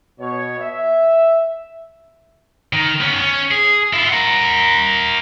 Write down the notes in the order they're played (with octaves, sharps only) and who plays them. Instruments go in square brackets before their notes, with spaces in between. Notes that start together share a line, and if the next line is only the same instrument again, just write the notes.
[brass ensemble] B2 C#5
E5
[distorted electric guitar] D#3
B3 C#4
C#4
G#4
E4 F4
A#4 F#5